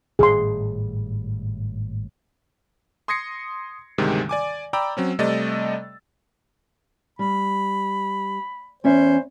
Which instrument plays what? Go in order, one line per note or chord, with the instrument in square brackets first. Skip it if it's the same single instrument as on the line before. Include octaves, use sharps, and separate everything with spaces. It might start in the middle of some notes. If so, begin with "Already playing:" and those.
[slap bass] G#1 A2 G3 [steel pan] G#4 C6
[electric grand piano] C6 D#6 G#6 A#6 C7 C#7
D2 G#2 C3 D#3 G3 G#3
D5 G#5 D6
D5 G5 A#5 B5 D6 E6
F#3 C4 C#4
C3 G3 A3 D5 D#5 A6
[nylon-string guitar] G3 [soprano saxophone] B5
[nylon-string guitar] E2 C#4 E5 [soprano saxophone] C5